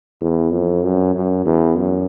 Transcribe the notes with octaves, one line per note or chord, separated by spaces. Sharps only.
E2
F2
F#2
F#2
E2
F#2